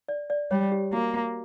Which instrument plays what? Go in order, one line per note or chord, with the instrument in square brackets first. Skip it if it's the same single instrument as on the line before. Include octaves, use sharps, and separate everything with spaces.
[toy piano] D5
D5
[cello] G3 [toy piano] C#5
[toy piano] G4
[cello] A#3 [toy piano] F#4